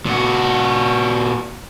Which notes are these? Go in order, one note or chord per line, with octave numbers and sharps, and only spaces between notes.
A#2 F#4